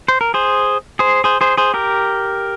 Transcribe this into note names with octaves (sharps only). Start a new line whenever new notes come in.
C5
A#4
G#4 C5
G#4 C5
G#4 C5
G#4 C5
G#4 C5
G4 A#4